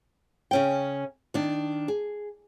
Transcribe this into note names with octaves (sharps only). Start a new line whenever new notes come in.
C#3 C#4 G5
D#3 D4
G#4